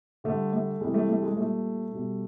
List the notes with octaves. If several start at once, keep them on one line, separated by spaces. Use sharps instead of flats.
D3 G3 A3
A3
C3 E3 G3 G#3
A3
A3
G#3
A#2 G3 A3
B2 G3